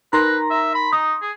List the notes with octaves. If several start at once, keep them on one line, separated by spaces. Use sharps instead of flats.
D#4 A#4 B4 A#5 C6 A#6
E5
B5
D#4 D#6
G#4